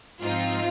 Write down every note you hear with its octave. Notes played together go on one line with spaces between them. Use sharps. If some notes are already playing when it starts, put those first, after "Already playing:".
G#2 F3 C4 D#4 F4